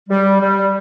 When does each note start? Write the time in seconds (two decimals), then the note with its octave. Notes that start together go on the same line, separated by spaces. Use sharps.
0.09 G3
0.41 G3